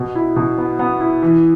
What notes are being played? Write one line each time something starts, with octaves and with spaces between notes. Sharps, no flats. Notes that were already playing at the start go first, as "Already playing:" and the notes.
Already playing: B2
E4
B2
B3
B3
E4
E3